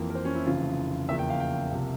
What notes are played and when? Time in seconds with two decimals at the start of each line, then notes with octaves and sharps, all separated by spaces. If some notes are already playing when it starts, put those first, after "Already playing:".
Already playing: F2 E3 A#3
0.10 A#4
0.15 C5
0.25 C#4
0.35 E4
0.46 F1 F2 C#3 E3 F4
1.09 E2 C#3 F3 A#3 E5
1.19 G5
1.30 F5
1.40 G5
1.71 C2 C3 F3 A#3